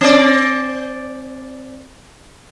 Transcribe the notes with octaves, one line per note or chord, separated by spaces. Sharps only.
C4 D5